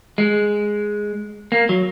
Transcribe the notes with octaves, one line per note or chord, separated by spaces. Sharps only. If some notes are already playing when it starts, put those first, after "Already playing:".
G#3
A#3
F#3